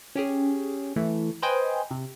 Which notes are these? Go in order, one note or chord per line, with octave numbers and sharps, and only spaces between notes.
C#4 G4 G#4
E3 A3
B4 C5 D#5 G5 G#5
C3